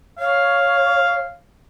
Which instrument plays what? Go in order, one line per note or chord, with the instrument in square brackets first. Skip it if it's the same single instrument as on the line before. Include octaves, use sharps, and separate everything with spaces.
[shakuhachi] C#5 [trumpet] F5